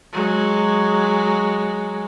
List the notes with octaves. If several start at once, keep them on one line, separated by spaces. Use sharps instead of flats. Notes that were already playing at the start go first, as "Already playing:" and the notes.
F#3 G#3